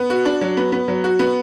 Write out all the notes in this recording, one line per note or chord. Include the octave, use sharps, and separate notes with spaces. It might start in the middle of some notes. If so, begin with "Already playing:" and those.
Already playing: B3
F#4
D4
F#3
B3
B3
F#3
F#4
B3